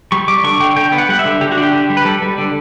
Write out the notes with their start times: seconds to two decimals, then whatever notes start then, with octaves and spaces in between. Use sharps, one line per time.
0.12 G3 C#6
0.28 G3 D6
0.44 D3 C#6
0.60 D3 G5
0.76 D3 G5
0.92 B3
0.98 F#5
1.09 G3 F#5
1.19 E5
1.25 D3
1.41 D3 G4
1.52 F#4
1.57 D4
1.63 G4
1.73 D3
1.90 G3
1.97 B4
2.05 G3 A4
2.22 G3
2.38 D3